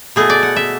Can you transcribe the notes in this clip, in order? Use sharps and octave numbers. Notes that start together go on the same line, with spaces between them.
B2 A3 G#4
D5
F#5
E5